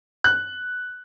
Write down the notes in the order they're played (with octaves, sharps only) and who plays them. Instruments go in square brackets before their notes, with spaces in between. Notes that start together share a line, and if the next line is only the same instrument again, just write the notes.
[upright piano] F#6